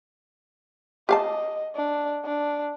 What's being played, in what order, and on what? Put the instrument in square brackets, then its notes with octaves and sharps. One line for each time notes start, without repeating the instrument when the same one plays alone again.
[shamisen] G4 F5 A5 [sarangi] D#5
[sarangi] D4
D4